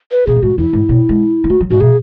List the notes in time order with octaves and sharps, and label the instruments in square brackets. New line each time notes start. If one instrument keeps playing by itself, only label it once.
[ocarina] B4
[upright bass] B2 [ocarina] G#4
[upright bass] A2
[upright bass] G#2 [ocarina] F#4
[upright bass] E2 [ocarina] E4
[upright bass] G#2
B2
G#3
B3
[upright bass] A3 [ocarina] F#4
[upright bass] F#3
[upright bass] G#2 [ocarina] F#4
[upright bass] B2 [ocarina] G#4